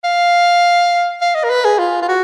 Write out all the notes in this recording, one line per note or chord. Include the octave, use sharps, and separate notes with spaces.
F5
F5
D#5
A#4
B4
G#4
F4
F4
F#4